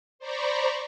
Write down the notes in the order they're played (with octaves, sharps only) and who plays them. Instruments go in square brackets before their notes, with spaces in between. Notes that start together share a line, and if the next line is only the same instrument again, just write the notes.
[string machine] C5 D5 A#5 B5 C#6